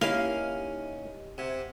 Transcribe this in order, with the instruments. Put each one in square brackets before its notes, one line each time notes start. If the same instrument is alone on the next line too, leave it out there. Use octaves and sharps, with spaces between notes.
[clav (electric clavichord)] A#3 E4 [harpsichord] C#4 G#5 [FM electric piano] D#4 G4 D#5 [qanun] F5
[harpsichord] C3 [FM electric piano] F#5 G#6